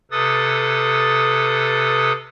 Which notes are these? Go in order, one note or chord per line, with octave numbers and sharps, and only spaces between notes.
C3 A4 B4 D#6 A6